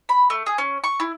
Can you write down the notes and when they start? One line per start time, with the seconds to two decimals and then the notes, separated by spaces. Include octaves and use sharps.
0.09 B5
0.30 A3
0.46 G#4
0.58 C#4
0.84 C#6
1.00 E4